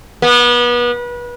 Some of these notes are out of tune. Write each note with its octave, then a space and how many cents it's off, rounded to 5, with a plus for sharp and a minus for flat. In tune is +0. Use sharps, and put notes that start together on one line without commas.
B3 -30